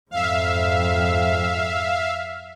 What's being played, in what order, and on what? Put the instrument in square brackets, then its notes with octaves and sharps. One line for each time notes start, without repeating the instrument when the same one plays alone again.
[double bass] F2 G#2 [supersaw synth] E5 F5